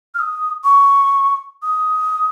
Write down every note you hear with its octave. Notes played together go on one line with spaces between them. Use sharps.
F6
D#6
C#6
D#6